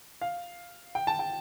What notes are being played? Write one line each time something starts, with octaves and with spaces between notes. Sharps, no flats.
F5
G5
A5
G5